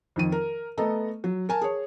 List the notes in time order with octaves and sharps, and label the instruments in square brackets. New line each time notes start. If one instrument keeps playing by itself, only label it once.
[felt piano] F2 D#3 D#7
A#4
A3 B3 A4 D#5 A#5
F#3
A#4 G#5 A5
G#4 C#5